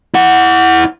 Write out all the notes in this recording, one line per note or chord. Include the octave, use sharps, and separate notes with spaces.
E4 F#5